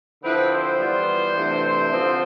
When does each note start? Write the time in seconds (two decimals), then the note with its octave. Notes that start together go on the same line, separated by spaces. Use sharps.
0.22 D3 F3 C4 E4 B4
0.51 C5
0.79 E3 G3 B3 F4
1.35 C3 E3 A3 D4 F4
1.63 C5
1.91 D3 F3 C4